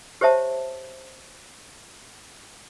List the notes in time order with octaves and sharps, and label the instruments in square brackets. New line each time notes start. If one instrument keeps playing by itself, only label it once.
[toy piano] G4 C5 C#5 E5 A5